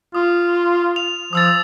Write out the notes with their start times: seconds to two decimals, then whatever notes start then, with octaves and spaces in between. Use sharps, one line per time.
0.15 F4 D#6
0.96 F7
1.33 F3 D#6 E6 A6